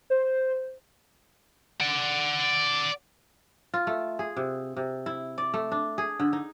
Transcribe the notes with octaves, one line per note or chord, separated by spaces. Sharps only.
C5
D5 F#5
F4
A3
G#4
C3
C3
E4
D5
A3
D4
G#4
D3
D#4